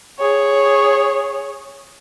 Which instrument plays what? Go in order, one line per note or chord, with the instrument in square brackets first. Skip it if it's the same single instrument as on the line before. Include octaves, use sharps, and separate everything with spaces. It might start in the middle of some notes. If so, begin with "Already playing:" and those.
[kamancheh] G#4 C#5